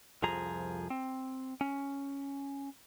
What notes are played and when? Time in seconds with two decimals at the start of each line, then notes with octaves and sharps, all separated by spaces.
0.23 C2 F2 F3 G#4 A#5
0.90 C4
1.61 C#4